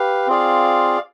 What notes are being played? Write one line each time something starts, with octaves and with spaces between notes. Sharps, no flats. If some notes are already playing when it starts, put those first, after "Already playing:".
Already playing: G4 B4 F5
C4 F4 G#4 D5 F5